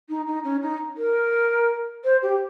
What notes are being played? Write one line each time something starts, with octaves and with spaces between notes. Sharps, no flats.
D#4
D#4
C#4
D#4
A#4
C5
G4